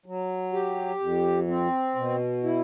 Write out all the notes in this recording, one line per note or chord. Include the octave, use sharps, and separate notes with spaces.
F#3
G4
F2
C4
B2
E4